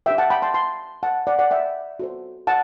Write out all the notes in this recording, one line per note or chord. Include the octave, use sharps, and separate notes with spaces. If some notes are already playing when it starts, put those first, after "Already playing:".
D4 G4 B4 E5 G5
F#5 A5
G5 B5
A5 C6
A5 C6
F#5 A5
D5 F#5
D5 F#5
E5 G5
F#4 A4 C5
F#5 A5